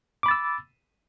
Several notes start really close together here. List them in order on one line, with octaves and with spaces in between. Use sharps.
D6 B5 A6 E6